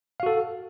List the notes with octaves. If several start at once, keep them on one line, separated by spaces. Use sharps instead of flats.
F#4 A4 F5